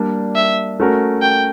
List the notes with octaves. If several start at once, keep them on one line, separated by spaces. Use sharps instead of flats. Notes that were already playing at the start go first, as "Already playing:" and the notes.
Already playing: G3 A#3 D4
E5
A3 C#4 F#4 A#4
G5